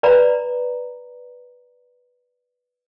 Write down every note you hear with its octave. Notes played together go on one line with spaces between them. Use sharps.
B4 D5 A#5 B5